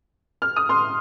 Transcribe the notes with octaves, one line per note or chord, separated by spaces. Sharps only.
F6
D#6
C6 F6